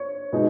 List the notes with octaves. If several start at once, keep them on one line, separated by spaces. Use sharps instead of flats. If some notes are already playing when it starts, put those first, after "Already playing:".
Already playing: C#5
B2 G#3 D#4